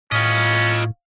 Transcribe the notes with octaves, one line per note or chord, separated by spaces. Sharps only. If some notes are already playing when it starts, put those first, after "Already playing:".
A2 C#4 F4 D#5